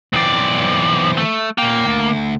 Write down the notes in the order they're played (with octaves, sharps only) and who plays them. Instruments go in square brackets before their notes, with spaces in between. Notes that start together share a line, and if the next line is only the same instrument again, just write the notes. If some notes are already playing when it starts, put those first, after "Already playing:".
[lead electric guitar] B1 D5 [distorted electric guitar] E3 C4
[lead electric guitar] A3
[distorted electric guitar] A#2 G5 [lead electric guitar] A#3
[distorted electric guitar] D2